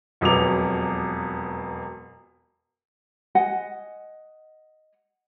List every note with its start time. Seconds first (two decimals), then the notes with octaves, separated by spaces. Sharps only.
0.21 E1 F2 F#3 B3 D6 F7
3.35 D#5 F#5 G#5